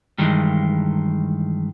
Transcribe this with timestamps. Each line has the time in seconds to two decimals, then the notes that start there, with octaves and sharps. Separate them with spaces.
0.18 G2 D#3 E3 G#3